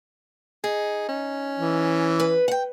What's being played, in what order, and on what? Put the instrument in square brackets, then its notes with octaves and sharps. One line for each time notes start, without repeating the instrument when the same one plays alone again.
[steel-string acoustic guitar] D#4 [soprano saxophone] G#4
[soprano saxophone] C#4
[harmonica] E3
[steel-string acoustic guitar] B4
F#5 G5